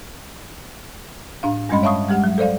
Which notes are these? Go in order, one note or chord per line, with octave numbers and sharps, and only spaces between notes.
A2 D4 F5
G2 G3 G#3 C#4 D#5 B5
C#5 E5 F5 A5 C#6 D#6
G3 G#3 G4 F#5
F#3
A4 C5 D5 F5